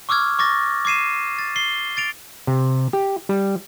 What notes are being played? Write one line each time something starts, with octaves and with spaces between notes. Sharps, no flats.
C#6 D6 E6 F6 G#6
C#6 D6 A6 A#6
D6 G#6 C7 D#7 E7
A6
C7 G7
A6 D7 F7
C3
G4
G3